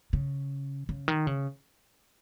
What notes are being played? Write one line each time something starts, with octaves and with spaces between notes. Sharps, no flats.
C#3
C#3
D#3
C#3